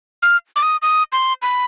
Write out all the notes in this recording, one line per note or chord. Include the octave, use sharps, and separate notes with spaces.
F6
D6
D#6
D#6
C6
B5